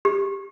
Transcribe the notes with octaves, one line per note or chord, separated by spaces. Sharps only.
G4